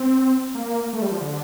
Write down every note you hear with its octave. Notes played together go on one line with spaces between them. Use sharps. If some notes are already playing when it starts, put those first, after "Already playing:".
Already playing: C4
A#3
A3
G3
F3
D3